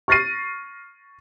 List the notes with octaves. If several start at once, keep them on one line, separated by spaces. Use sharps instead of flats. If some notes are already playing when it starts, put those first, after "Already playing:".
C#6 F6 A6 A#6 C7 D#7